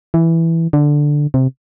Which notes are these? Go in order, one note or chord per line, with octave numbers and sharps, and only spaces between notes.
E3
D3
C3